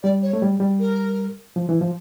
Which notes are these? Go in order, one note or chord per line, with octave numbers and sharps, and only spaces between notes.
G3 D5
C#5
A3
G3
G3
A#4
F3
E3
F3